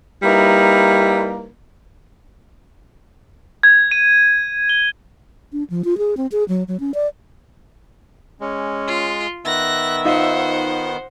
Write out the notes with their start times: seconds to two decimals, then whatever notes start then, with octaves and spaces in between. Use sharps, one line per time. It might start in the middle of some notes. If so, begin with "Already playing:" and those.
0.23 G3 A#3 D#4 E4 B4
3.63 G#6
3.91 D#7
4.69 G7
5.53 D4
5.70 F3
5.84 F4
5.98 G#4
6.17 C4
6.32 G#4
6.48 F#3
6.68 F#3
6.80 C#4
6.94 D5
8.40 G#3 C#4
8.87 F4
9.45 D#3 B3 E5 F#6 A#6
10.05 D#4 F4 C5 F#5